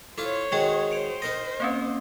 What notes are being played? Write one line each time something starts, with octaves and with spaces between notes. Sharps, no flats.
E4 F4 A4 C5 C#5 F5
D#3 G#3 F#4 G5 C#6 G#6
C5 C#7 D7 F7
D#4 A#4 D#5 A#6
A#3 C4 C#4